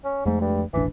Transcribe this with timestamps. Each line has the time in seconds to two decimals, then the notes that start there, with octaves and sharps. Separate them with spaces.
0.04 C#4
0.26 F2 G#2 G#3 A3
0.41 G2
0.73 E1 A1 E3 D4